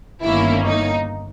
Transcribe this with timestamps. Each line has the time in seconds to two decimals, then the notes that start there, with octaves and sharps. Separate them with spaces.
0.22 G1 G2 D#3 A#3 C#4 E4
0.64 D#4